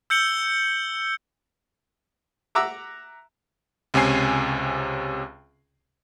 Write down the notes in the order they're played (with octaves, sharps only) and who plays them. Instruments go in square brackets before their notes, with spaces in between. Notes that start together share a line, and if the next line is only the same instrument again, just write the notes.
[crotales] E6 G6 C#7 F#7 G7
[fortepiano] E5 F#5 A#5 D6 E6
[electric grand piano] C#2 C3 C#4 G#5 C7